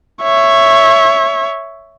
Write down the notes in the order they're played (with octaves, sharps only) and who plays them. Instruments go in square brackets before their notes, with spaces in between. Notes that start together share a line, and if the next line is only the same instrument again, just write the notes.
[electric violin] C#5 E5